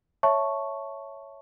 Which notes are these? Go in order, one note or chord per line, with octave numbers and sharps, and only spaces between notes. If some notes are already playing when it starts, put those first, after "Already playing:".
C#5 E5 A5 C#6